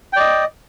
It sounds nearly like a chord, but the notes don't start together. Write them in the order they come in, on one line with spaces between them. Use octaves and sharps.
G5 D5 D#5